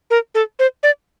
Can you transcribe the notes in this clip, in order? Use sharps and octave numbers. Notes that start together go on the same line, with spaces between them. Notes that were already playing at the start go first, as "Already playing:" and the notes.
A#4
A4
C5
D5